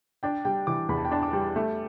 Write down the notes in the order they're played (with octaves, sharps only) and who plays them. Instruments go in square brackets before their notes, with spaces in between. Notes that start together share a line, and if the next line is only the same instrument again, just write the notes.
[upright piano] D4 [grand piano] G5
[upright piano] G3 [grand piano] G5
[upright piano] E3 [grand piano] D6
[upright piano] E2 [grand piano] B5
[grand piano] A5
G5
[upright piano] D4 [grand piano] A5
[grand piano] D6
[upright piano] G3
A3